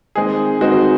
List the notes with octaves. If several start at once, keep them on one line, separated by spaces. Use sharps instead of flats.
D#3 G#3 C4 D#4 G#4
D#3 G#3 C4 D#4 F#4